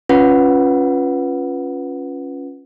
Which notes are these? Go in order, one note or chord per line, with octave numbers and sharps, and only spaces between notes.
C#4 F4 B4 F#5